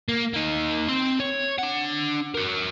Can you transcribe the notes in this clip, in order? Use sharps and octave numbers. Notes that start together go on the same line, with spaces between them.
A#3
A#3 D#4
C4 C6
C#5
D4 F#5
F#4 A#4